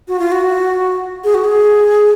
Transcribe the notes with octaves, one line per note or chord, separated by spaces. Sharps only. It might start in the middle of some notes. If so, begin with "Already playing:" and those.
F#4
F4
F#4
G#4
F#4
G#4